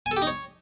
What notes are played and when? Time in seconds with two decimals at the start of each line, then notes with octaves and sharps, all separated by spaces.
0.06 G#5
0.11 A4
0.17 G4
0.22 D#4
0.27 C#5